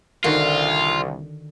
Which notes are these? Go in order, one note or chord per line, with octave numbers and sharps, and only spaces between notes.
C2 D3 D#3 F4 F#4